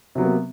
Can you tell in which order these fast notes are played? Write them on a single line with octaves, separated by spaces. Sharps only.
C3 F#3 B3 A#3